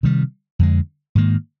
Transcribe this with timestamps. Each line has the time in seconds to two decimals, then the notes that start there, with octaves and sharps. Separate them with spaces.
0.03 C3 D#3 G3
0.59 F2 D3 G#3
1.15 G#2 D#3 A#3